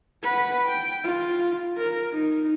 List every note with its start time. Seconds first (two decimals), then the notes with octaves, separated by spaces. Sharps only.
0.23 B4 F#5
0.66 G5
1.04 F4
1.78 A#4
2.13 D#4